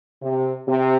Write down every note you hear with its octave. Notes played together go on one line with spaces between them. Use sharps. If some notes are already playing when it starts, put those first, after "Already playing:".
C3
C3